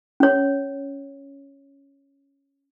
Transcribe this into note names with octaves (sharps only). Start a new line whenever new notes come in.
C#4 C#5